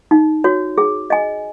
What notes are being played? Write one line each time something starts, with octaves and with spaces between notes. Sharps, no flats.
D#4
F#4 C#5
G#4
D#5 G#5